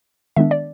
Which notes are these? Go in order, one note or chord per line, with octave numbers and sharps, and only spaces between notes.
D#3 G#3 B3 D4 E5
D5